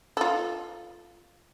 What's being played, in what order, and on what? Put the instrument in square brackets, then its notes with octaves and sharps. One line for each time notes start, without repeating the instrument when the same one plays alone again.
[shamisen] F4 A4